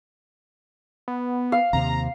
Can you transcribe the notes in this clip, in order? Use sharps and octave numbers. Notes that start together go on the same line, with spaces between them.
B3
F5
D#2 C3 C4 A#5